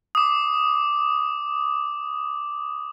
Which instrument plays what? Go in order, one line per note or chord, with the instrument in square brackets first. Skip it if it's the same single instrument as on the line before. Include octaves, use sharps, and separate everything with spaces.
[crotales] D6 D#6